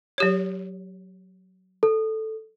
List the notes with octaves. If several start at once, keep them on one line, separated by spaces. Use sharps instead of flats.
F#3 G4 C#5
A4